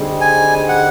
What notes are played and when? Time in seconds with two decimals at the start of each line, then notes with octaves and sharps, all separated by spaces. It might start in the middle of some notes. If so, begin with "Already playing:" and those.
Already playing: D3 G3 C4 D#4 G#4
0.21 G#5
0.69 F#5